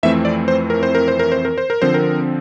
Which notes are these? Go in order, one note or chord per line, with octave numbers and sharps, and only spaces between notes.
F2 E3 A3 C4 E5
D5
C5
A#4
C5
A#4
C5
A#4
C5
A#4
C5
A#4
D3 F3 C4 C5
A#4